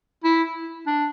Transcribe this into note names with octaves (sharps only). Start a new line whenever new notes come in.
E4
D4